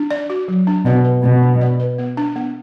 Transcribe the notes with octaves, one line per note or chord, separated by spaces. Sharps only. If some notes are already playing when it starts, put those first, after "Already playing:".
Already playing: D4
D5
F#4
F#3
D4
B2 D5
B4
B2 B3
D4
D5
B4
B3
D4
B3